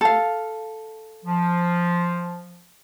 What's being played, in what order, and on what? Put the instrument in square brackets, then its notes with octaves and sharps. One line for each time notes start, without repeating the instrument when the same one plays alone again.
[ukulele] A4 F5
[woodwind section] F3